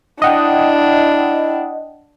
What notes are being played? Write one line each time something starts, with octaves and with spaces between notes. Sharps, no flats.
D4 E4 D#5 F#5 G5